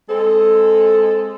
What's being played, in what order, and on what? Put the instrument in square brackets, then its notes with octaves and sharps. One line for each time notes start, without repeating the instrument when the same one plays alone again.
[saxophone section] G#3 C4 A4